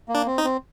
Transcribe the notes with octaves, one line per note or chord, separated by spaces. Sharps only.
A#3
D4
C4
D#4
C4